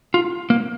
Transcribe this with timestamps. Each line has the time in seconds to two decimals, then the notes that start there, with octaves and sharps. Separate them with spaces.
0.14 F4
0.50 A#3